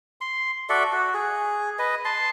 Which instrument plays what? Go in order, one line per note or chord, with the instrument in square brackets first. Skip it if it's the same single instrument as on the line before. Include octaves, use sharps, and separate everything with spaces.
[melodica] C6
F#4 A4 D5 E5
F#4
G#4
B4 D#5
A5 C6